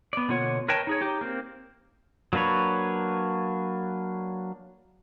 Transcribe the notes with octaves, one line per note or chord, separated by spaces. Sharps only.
B3 D5
B2 D3 A#3 F4 C#5 F#5
A#4 B4 C#5 D#5 G5 A5
D#4 G#4 C#5
D#4 G4
A#3 C4
F#3 A#3 D4 B4 C#5